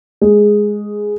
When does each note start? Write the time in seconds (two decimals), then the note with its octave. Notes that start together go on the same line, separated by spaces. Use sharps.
0.21 G#3